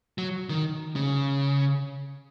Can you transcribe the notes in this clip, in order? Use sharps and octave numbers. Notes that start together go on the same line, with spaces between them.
F#3
D#3
C#3